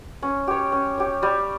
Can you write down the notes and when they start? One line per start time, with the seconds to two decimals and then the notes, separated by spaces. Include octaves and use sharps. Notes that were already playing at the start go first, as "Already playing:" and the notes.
0.22 C#4
0.48 G4 C#5
0.72 C#4
0.98 G4 C#5
1.23 G3